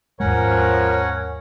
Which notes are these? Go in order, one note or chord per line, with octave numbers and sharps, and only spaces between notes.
D#2 G#2 F3 G#3 C#4 A#4 C#5 F#5